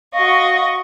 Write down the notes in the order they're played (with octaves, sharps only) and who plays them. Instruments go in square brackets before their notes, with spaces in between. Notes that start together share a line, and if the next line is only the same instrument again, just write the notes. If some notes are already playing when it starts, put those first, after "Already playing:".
[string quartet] F#4 D#5 C#6 [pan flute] F5